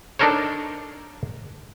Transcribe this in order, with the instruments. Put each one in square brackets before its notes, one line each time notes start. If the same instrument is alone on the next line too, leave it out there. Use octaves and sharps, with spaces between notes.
[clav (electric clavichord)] D4 D#4 A4 A#4 C5 C#5